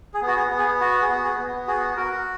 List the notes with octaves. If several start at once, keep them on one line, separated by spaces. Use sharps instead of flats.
G#4
B3
F#4
G#4
B3
G#4
F#4
G#4
B3
G#4
B3
F#4 G#4
F#4 A#4